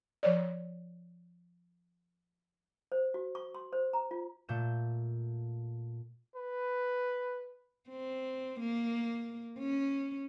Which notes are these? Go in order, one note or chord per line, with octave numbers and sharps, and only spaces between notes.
F3 C#5 D5
C5
F#4
C#6
C6
C5
A#5
F4
A#2 A3 G6 E7
B4
C4
A#3
C#4